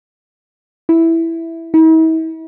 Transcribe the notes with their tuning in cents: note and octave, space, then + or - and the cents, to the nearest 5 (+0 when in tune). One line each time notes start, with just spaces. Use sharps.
E4 +0
E4 -45